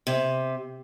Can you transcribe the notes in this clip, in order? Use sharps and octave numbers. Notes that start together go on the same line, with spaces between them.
C3